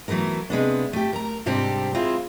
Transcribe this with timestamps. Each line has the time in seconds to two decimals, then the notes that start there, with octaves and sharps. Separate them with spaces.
0.08 E3 F#3 A3 B3 A#4
0.50 C3 G#3 B3 D4
0.93 A3 G4
1.13 A#4 A#5
1.46 G#2 C3 G3 C4 D4 G4
1.94 G#3 C4 E4 F4